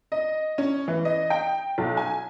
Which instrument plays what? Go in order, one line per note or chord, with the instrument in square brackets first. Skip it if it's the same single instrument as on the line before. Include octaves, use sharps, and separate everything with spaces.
[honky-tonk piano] D#5
C#4
E3
D#5
G5
B1
G#5